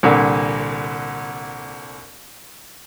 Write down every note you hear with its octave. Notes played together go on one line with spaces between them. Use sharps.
C2 A#2 D3